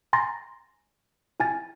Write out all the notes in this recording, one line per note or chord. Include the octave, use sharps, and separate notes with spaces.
G#5 A#5 C6 A6 A#6
E4 G#5 A6